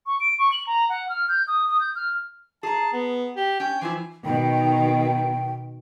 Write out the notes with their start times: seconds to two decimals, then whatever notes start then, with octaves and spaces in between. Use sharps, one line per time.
0.06 C#6
0.20 D7
0.39 C#6
0.52 F#7
0.67 A#5
0.89 F#5
1.09 F6
1.29 G6
1.48 D#6
1.68 D#6
1.80 G6
1.95 F6
2.63 G#4 A5 A#5
2.93 B3
3.36 G4
3.60 C#4 G5
3.81 E3 F3 E4 G#5
4.25 B2 D#3 G5